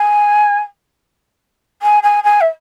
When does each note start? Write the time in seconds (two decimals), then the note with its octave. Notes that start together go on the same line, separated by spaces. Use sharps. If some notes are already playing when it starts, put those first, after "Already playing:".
Already playing: G#5
1.82 G#5
2.03 G#5
2.24 G#5
2.41 E5